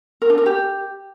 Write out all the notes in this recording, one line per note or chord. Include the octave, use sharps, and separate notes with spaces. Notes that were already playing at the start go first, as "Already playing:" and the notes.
A#4
D4
A#4
G4